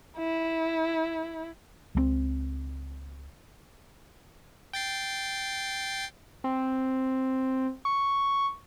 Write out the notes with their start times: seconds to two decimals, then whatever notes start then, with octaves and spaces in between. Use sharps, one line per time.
0.17 E4
1.95 C#2 F3 C4
4.73 G5 A6 C7
6.44 C4
7.85 C#6